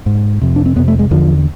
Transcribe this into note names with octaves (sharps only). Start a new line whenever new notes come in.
G#2
F2 C3
D4
C4
F2 C3 B3
A3
G#3
E2 D3 F3